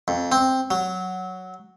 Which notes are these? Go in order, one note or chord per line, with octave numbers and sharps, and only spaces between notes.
F2
C4
F#3